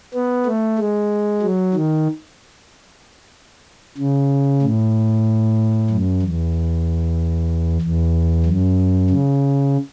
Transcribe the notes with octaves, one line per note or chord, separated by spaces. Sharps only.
B3
A3
G#3
F#3
D#3
C#3
A2
F#2
E2
E2
F#2
C#3